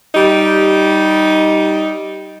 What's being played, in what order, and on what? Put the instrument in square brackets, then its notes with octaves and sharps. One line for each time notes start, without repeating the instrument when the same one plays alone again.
[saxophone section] G3 D#4 G4